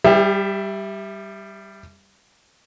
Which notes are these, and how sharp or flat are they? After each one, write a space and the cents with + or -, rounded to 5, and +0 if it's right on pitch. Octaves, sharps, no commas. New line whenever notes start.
G3 +0 G4 +45 E5 +0